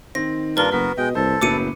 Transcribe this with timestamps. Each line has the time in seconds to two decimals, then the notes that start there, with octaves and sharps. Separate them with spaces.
0.15 D#3 C4 A#6
0.57 G2 A#3 D4 F4 A#4 B4 F6 G7
0.72 F#1 B3 F#4 A#4 B6
0.98 B2 G#3 D#5 G5
1.15 F#1 C2 A4 C5
1.41 F#1 A2 F#3 B3 D6 C#7 D#7